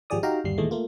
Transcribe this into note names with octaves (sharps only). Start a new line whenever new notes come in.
G#1 F3 G4 G#4 D5 D#6
D#4 F#4 G4 F5 G5 A#5
G1 D#2 G3 C7
D#2 A#2 E3 G#3 A3
A3 A#3 F4